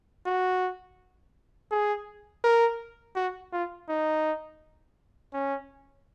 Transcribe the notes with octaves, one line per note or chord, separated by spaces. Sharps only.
F#4
G#4
A#4
F#4
F4
D#4
C#4